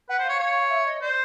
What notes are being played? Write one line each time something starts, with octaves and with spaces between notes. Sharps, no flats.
B4 F#5
C5
F5
C#5
C#5
F5
E5
D#5
C5 D5